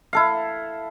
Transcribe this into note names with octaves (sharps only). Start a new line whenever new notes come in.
E4 A4 F5